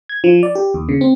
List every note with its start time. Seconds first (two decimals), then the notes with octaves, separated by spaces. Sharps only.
0.09 G#6
0.24 F3
0.43 D5
0.55 G4
0.74 D#2
0.89 C#3
1.01 C4